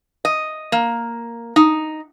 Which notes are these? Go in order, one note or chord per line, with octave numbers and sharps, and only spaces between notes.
D#5
A#3
D#4